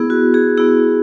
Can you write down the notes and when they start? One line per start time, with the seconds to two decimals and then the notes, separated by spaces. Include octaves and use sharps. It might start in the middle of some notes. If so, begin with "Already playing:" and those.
Already playing: B3 E4 G#4
0.10 F#4
0.34 G#4
0.58 B3 E4 G#4